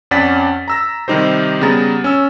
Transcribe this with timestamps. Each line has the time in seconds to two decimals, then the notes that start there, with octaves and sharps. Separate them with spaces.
0.11 F2 C#4 D5 F#5 A6 B6
0.68 A#5 E6 A#6
1.08 C3 D#3 G3 D#4 G4 C5
1.61 C#3 G3 B3 G#4 A#5 A6
2.04 C#4 E6